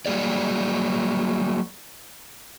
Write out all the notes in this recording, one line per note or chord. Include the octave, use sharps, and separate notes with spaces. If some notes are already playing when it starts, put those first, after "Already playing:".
F#3 G3 A#3 G#4 D5